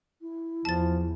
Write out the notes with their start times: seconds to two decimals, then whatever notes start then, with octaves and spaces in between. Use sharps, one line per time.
0.21 E4
0.65 E2 F3 A5 A6